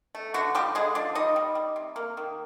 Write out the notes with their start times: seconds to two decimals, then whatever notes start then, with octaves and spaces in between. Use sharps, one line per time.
0.15 A3
0.34 D3 F#3 F#4
0.55 F3 G3 G4
0.75 D3 G#3 G#4
0.95 F3 D4 D5
1.15 G3 D#4 D#5
1.36 G3
1.55 G3
1.76 C3
1.96 A#3
2.17 D#3